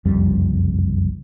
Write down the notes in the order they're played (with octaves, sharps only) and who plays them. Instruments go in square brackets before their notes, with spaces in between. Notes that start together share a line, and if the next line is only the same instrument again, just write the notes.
[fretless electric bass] F#1 C2 F2 G3